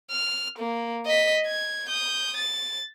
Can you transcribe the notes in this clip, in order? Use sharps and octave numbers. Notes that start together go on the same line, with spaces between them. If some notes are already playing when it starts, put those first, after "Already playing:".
F6
A#3
D#5 B6
G#6
D#6 G6
A6